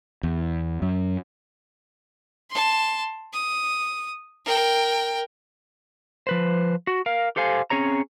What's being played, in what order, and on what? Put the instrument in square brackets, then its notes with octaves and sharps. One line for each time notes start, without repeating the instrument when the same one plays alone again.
[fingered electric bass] E2
F#2
[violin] A5 C6
D#6
A#4 G5
[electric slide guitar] F3 B4 C5
F#4
A#4 F5
G4 A4 C5 F5 G#5
C4 C#4 G#4 C#5 A#5